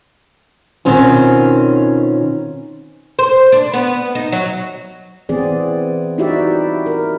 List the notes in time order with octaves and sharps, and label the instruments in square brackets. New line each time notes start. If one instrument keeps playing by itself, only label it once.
[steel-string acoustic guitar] B2 D#3 C4 C#4 F4
[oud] C5
D4
B3
D#4
F#3
[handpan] E3 B3 C4 G#4 D5
D#4 E4 F#4 G4 D5 E5
A#4